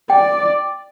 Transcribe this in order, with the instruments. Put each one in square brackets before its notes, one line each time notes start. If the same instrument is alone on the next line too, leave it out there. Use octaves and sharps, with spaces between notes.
[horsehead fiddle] D5 [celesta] G5